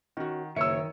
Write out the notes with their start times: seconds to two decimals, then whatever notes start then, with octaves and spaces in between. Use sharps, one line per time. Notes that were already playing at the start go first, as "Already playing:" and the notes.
0.17 D#3 C#4 F#4
0.56 F#1 D#3 C#5 E5 E6 C#7